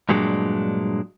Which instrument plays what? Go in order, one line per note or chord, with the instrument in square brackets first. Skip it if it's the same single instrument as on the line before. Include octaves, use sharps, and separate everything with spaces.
[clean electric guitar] G2 A#2 F#3 G#3 B3 D4